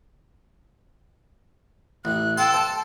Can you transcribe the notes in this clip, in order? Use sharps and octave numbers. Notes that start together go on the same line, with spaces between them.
A1 F#6
A4 F5 G5 A5 C6
C5 A5